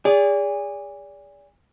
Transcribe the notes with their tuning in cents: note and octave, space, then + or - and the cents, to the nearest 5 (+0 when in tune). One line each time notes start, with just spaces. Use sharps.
G#4 -30 D5 -30